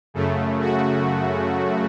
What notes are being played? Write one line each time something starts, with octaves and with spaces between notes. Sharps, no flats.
F#2 C#3 A3
F#4